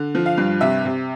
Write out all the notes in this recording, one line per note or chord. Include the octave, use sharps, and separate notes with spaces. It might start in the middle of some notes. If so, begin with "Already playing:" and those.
Already playing: D3
F3
F5
G2
C3 E5
C3